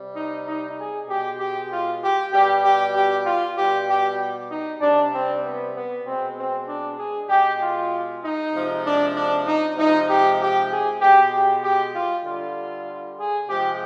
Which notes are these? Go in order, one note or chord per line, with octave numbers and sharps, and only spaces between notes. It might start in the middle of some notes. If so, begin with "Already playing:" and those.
Already playing: C3 G3
D#4
D#4
G#4
B2 G#3 G4
G4
F4
G4
B2 G3 G4
G4
G4
F4
B2 G3 G4
G4
D#4
C3 G3 D4
C4
B3
B3
B2 G#3 C4
C4
D4
G#4
B2 G#3 G4
F4
D#4
C3 F3 G#3
D4
D4
D#4
C3 F3 G#3 D#4
G4
G4
G#4
B2 G#3 G4
G4
G4
F4
D3 G3 F4
G#4
C3 F3 G#3 G4